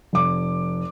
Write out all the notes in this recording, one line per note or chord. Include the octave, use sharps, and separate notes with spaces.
F1 D6